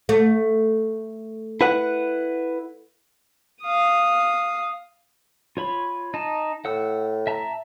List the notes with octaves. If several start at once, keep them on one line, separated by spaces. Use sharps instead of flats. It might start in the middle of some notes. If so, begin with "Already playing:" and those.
A3
E4 B4 F#5
F5 D#6
F4 C#5 B5
D#4 A5
A2 F#5 E6
E5 A5 A#5